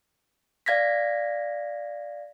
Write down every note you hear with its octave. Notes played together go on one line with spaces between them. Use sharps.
D5 F5 G#6 A#6 B6